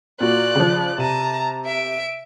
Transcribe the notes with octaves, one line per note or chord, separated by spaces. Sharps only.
A#2 A#3 F#4 D5 F#6
C#3 F3
C3 A5 A#5 D#7
E5 D7